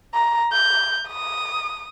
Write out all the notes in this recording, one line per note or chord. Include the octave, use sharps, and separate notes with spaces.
A#5
G6
D#6